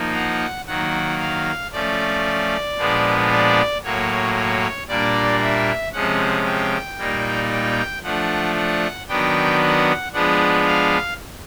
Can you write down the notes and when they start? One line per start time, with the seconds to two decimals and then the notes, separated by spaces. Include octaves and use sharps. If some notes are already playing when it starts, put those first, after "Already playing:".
Already playing: F3 A#3 D#4
0.14 F#5
0.67 D#3 F#3 A#3 F#5
1.20 F5
1.72 F3 A3 C#4 D5
2.77 A#2 F3 G#3 B3 D4
3.30 D5
3.83 A2 F#3 A#3 C#5
4.36 C#5
4.88 A#2 G3 A#3 D4 D5
5.41 E5
5.93 C3 F3 G#3 C#4 F#5
6.45 G5
6.98 A#2 G3 A#3 D#4
7.51 G5
8.03 F3 A3 D4 F#5
8.56 F#5
9.09 D#3 F#3 B3 D4 G5
9.61 F#5
10.13 F3 G#3 B3 D4 F#5
10.66 F5